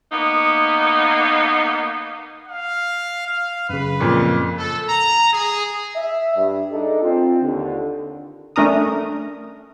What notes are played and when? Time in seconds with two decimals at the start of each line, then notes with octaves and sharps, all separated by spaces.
0.11 A#3 B3 D#4
2.48 F5
3.27 F5
3.70 F#2 C#3 B4
4.00 F2 A#2
4.57 A4
4.87 A#5
5.33 G#4
5.96 E5
6.35 G2
6.72 D4 D#4 G#4 A4 D#5
7.02 C4 F4
7.42 D#2 D3
8.56 A3 C#4 D4 A#4 A#5 D#6